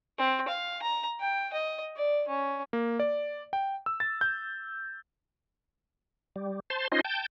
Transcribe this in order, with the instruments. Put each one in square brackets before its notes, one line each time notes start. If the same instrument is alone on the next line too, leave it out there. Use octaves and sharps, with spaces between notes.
[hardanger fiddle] C4
F5
A#5
G5
D#5
D5
C#4
[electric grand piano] A#3
D5
G5
E6
A6
G6
[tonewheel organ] G3
C5 A5 C6
C#4 D#4 F4 C5 D#5 C6
G5 A5 G6